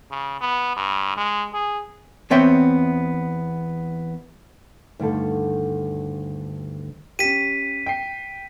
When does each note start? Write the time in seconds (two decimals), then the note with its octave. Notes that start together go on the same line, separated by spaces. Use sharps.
0.11 C#3
0.41 B3
0.76 G2
1.17 G#3
1.53 G#4
2.30 E2 B3 C4 C#5 E5 G5
4.99 D2 G2 D3 D#3 A4
7.19 C#4 G4 B6 D#7
7.86 G5 C7